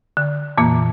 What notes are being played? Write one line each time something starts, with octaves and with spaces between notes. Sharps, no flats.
D3
F2 A#2 E3 A#3